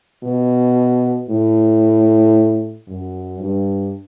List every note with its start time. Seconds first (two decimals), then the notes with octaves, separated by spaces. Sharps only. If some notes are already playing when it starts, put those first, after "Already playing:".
0.23 B2
1.29 A2
2.88 F#2
3.40 G2